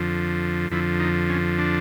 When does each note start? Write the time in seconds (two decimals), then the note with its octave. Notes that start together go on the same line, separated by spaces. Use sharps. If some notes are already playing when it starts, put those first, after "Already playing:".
Already playing: F2 D3 F3
0.70 F2 D3 F3 E4
1.00 D#4
1.29 C#4
1.58 D4